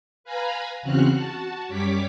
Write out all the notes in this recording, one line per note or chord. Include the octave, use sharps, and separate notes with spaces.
B4 F5 G#5 A#5 B5
E2 C#3 C4 F#4 F6 F#6
F#4 A5
F#2 G3 C#5 D6 B6